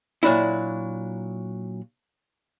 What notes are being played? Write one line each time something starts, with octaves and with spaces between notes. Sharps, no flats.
A#2 F#3 D4 E4